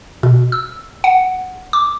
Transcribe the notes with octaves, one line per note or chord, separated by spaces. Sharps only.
B2
E6
F#5
D6